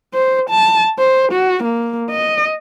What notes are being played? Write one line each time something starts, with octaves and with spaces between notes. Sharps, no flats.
C5
A5
C5
F#4
A#3
D#5